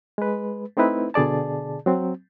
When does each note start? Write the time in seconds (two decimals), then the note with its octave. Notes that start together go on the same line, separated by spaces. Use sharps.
0.18 G#3 B4
0.77 A3 C4 D#4 E4 B4
1.14 B2 D3 G#4 D5 A5
1.86 F#3 C4